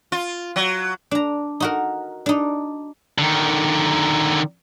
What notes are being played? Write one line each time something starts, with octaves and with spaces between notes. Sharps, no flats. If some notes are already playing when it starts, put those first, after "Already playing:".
F4
F#3
D4 A#5
D#4 F#4 A#4
D4 D#4
D3 D#3